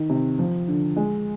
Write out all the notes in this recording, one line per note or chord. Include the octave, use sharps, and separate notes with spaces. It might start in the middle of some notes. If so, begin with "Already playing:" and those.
Already playing: D#3
C3
F3
D3
G#3